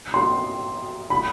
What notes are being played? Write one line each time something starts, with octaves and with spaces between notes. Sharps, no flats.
C6
B5